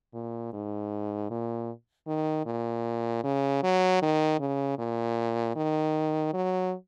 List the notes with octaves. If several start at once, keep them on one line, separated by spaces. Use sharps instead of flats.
A#2
G#2
A#2
D#3
A#2
C#3
F#3
D#3
C#3
A#2
D#3
F#3